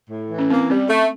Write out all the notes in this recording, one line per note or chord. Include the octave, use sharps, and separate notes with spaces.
A2
E3
C#4
A#3 C4
G3 C4
A3